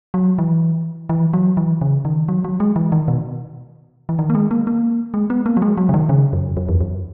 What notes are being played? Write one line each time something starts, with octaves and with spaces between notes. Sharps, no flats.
F#3
E3
E3
F#3
E3
C#3
D#3
F#3
F#3
G#3
E3
D#3
B2
E3
D#3
A#3
G#3
A#3
A#3
G#3
B3
A#3
F#3
G#3
F#3
C#3
D#3
C#3
F#2
F#2
E2
F#2